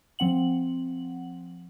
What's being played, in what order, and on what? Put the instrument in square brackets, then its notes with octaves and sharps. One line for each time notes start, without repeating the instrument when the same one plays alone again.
[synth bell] F3 C4 F#5 F#7